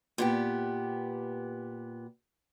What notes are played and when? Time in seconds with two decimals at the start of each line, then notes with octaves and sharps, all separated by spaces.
0.18 A#2 B3 G4